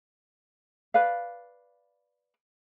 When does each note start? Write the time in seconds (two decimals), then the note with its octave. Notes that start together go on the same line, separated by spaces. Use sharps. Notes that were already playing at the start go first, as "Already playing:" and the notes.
0.94 B4 D5 F5